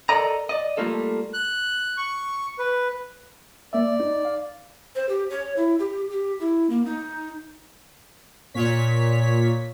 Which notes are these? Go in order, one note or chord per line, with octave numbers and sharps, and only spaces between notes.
A4 A#4 D5 D#5 A#5
D5 D#5
G3 A3 A#3 F4 A4
F#6
C#6
B4
A#3 D5 E5
D#4
F5
C5
G4
C#5
E4
G4
G4
E4
A#3
D#4
A#2 C#5 B6